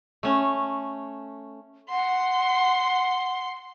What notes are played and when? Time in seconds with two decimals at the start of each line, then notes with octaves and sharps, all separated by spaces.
0.23 A3 C#4
1.90 F#5 C6